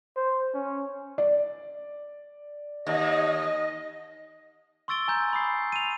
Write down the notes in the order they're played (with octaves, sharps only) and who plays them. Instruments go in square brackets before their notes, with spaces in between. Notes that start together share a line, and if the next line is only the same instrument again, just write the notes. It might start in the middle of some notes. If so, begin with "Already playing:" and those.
[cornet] C5
C#4
[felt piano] D5
[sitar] D#2 [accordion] D#5
[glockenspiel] C6 C#6 E6 A6 D7 G7
G#5 A#5 G6
B5 D#6 C7
D#7 F7